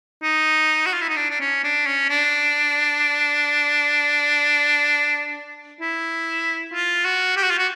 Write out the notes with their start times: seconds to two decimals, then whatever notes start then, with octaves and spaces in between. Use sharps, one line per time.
0.23 D#4
0.86 F#4
0.94 F4
1.02 E4
1.09 D#4
1.16 D4
1.30 D4
1.41 C#4
1.64 D4
1.86 C#4
2.09 D4
5.81 E4
6.74 F4
7.05 F#4
7.37 G4
7.43 F#4
7.50 F4
7.59 F#4